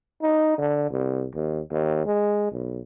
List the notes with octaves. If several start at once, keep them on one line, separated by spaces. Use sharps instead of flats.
D#4
D3
C2
D#2
D#2
G#3
B1